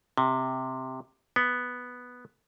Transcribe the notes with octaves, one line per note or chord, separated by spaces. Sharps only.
C3
B3